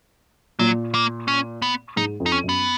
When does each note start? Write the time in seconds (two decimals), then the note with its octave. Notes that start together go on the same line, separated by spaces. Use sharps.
0.59 A#2 F#3
0.94 A#3
1.28 C#4
1.62 B3
1.97 G#2 D#4
2.20 F2
2.26 D#4
2.32 C#4
2.44 F#2
2.49 B3